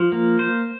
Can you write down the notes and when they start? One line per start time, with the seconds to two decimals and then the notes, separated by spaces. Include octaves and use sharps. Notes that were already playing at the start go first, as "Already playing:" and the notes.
Already playing: F3
0.12 A#3
0.39 C5